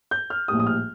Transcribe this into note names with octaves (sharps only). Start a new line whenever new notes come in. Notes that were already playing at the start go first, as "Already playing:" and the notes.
G6
F6
A#1 A2 G3 D#6
D#6
F6